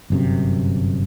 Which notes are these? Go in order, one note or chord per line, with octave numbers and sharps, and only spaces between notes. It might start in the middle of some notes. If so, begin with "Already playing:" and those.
G1 F#2 C3